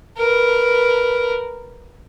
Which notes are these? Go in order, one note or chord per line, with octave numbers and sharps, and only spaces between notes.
A#4 B4